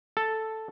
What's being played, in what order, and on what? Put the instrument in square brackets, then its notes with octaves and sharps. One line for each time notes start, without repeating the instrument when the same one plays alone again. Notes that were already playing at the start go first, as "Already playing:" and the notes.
[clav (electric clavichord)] A4